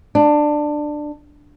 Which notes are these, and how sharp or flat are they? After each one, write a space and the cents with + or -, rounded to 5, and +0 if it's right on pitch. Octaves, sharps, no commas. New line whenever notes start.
D4 +15